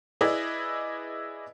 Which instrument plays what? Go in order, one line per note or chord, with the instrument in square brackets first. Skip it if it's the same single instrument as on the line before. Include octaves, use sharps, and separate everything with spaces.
[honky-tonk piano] E4 G#4 B4 D5 D#5